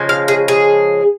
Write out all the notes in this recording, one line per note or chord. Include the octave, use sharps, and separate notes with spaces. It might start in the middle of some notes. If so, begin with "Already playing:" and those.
Already playing: C#3 F3 G#3
F5
G#4
G#4